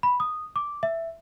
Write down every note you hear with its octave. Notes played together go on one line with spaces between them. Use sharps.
B5
D#6
D6
E5